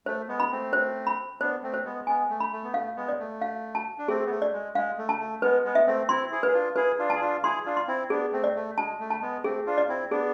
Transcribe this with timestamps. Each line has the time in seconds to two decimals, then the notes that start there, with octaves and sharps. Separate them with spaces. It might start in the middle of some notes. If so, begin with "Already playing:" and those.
0.06 A3 C5
0.29 G#3 B3
0.40 B5
0.51 A3 C4
0.73 C5
1.07 B5
1.40 B3 D4 C5
1.63 A3 C4
1.74 C5
1.85 G#3 B3
2.07 G#3 B3 G#5
2.30 A3
2.40 B5
2.52 A3
2.64 B3
2.74 A3 F5
2.96 G#3 B3
3.08 D5
3.19 A3
3.41 F5
3.75 A5
3.98 D4
4.08 A3 C4 G#4
4.26 B3
4.31 A3
4.42 D5
4.53 G#3
4.75 G#3 F5
4.98 A3
5.09 A5
5.19 A3
5.42 G#3 B3 B4
5.64 G#3 B3
5.75 E5
5.87 A3 C4
6.09 C4 E4 C6
6.32 E4 G#4
6.43 G#4 B4
6.54 D4 F4
6.76 E4 G#4 B4
6.99 D4 F4
7.10 A5
7.15 G#4
7.21 D4 F4
7.43 E4 G#4 C6
7.66 D4 F4
7.77 C6
7.88 C4 E4
8.10 B3 D4 G#4
8.33 A3 C4
8.44 D5
8.55 A3
8.77 G#3 A5
9.00 A3
9.10 A5
9.22 G#3 B3
9.44 A3 C4 G#4
9.67 D4 F4
9.78 D5
9.89 C4 E4
10.11 B3 D4 G#4